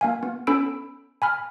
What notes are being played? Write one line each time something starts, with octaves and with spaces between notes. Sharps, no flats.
A#3 F5 G#5
B3
B3 C#4 A4 B5 E6 D7
G#5 B5 F6